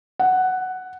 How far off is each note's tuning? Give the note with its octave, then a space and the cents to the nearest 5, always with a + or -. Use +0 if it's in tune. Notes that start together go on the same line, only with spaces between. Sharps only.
F#5 +5